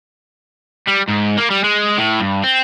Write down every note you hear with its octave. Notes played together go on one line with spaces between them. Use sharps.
G3
G#2
A#3
G3
G#3
A2
G2
C4